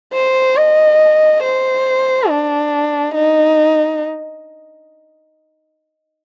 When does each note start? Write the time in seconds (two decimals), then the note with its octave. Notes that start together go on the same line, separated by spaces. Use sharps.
0.14 C5
0.57 D#5
1.43 C5
2.29 D4
3.15 D#4